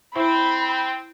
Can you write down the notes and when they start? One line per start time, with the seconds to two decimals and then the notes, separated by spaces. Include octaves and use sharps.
0.16 C4 E4 C5 E5 B5